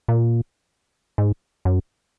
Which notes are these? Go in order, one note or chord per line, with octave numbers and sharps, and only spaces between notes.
A#2
G#2
F#2